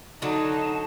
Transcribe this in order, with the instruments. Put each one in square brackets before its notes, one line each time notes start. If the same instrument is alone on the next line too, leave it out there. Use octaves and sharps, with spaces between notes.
[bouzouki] D3 F#3 [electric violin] D#4 [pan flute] A5